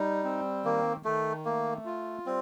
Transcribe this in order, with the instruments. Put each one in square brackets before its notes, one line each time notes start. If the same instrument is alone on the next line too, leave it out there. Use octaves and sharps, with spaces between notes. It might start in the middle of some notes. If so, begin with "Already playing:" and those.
Already playing: [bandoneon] G3 D#4
C4
[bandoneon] D#3 [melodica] A#3
[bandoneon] D#3 [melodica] A3
[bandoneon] A3 [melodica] A#3
[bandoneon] F4
[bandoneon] G3 [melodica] C4